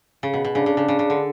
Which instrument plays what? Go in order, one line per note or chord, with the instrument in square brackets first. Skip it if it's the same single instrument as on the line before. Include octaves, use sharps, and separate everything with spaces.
[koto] C#3
B2
B2
[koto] C#3 [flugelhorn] D4
[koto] C#3
C#3
C#3
C#3
D3